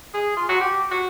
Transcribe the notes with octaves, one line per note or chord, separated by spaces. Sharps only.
G#4
F4
F#4
G4
F#4